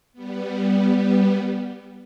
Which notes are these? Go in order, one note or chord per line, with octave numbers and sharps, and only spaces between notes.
G3 B3